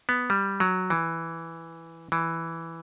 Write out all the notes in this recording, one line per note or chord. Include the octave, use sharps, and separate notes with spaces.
B3
G3
F#3
E3
E3